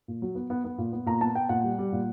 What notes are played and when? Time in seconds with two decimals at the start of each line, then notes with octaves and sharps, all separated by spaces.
0.08 A#2
0.22 F#3
0.35 B3
0.50 B3
0.64 B3
0.78 A#2
0.93 B3
1.06 A#2 A#5
1.21 B3 A5
1.35 B3 G5
1.49 A#2 F#5
1.64 G3
1.78 G3
1.92 A#2